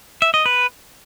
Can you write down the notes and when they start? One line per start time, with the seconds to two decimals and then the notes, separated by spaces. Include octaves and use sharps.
0.22 E5
0.34 D#5
0.46 B4